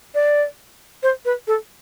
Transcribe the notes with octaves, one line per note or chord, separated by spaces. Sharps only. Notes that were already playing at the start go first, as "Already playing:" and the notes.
D5
C5
B4
A4